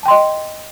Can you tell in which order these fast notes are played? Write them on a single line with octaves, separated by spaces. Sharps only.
A5 G5 C6 D#5